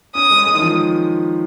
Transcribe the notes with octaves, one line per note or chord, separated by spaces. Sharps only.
C#4 D#6
G#3
G#3
D#3
F3